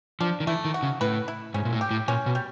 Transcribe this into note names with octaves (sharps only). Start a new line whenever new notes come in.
F3 D4
D#3
E3 A3
D#3
F#4
C#3
A2 B4
E4
G#2 C#4
A#2
A2
G4
A2
A#2 C#4
B2
G3